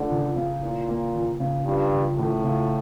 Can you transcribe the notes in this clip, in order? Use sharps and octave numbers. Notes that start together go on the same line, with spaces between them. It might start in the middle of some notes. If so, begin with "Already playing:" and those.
Already playing: D3 F3 A3
C#2
C#3
A#2 E3
A#3
C#2
C#3
G2 F3
C#2
C#2 A2
C#3